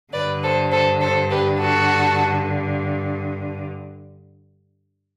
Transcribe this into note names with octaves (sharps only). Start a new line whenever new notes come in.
G2 D3 B4 D5
A4 C5
A4 C5
A4 C5
G4 B4
F#4 A4